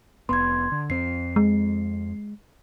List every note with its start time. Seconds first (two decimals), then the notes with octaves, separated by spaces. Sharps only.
0.29 F1 B3 C6 G#6
0.72 D3
0.90 F2 C4 C7
1.36 G#3